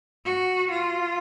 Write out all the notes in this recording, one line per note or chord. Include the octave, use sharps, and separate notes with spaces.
F#4
F4